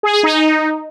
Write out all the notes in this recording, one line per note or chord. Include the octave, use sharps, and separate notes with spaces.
G#4
G#4
D#4